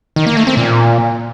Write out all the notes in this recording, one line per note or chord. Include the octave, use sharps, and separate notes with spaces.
D#3
A#3
A3
C4
A#2